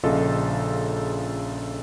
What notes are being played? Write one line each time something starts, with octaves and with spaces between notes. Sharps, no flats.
A#1 C#3 F4 A4 D#5